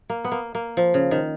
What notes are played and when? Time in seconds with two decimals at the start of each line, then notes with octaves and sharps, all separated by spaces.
0.10 A#3
0.24 B3
0.32 A#3
0.55 A#3
0.77 F3
0.94 C#3
1.11 D#3